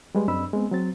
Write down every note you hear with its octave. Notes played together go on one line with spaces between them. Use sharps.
G3 G#3 B4
F#2 C4 D4 D#5 B5 E6
G#3 B3 C4
F#3 C4 A6